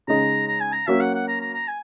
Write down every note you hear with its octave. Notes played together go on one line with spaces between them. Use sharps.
C#3 G#3 D#4 A#5
A#5
G#5
A#5
F#3 A#3 C#4 F#4 E5
F#5
F#5
A#5
A#5
A#5
G#5